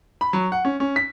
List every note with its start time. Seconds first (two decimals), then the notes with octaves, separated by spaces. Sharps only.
0.21 B5
0.33 F#3
0.52 F#5
0.65 C#4
0.80 C#4
0.96 B6